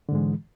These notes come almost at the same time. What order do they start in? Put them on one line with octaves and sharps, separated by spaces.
D3 G#2 G#3 E3